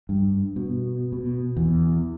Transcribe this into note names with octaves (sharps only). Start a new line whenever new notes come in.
G2
B2
B2
E2